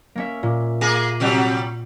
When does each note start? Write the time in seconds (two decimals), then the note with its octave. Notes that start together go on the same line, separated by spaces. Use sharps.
0.15 A#3 C#4 E5
0.43 A#2
0.81 A#3 G#4 D6 A#6 C#7
1.20 C3 F#3 G3